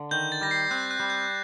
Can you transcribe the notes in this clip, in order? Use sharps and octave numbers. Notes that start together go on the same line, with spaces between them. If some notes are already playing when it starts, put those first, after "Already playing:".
Already playing: D3
D#3 G6
A6
G3 A#6
C7
C4 F#6
F#6
G3
G6